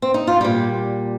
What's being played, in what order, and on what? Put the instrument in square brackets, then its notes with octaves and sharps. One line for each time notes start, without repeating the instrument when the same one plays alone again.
[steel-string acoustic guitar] C4
D#4
F4
A#2 G3 G4